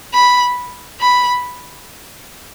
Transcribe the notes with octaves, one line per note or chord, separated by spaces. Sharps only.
B5
B5